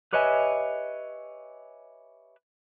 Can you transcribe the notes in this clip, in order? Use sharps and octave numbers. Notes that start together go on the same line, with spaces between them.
G4 B4 C#5 D#5 E5 G#5